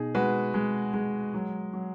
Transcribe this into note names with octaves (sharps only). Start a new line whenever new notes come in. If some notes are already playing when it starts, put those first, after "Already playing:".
Already playing: B2 D#4 G#4
G#3 F#4 B4
G#3
G#3
F#3
F#3